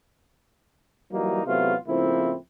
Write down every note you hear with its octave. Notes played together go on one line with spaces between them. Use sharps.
E3 F#3 G3 A#3 D#4
E2 C3 F#3 A3 B3 F4
A2 C#3 F3 A#3 C4 E4